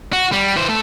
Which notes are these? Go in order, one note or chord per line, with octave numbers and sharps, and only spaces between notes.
F#4
G3
E3 C5
A3 A4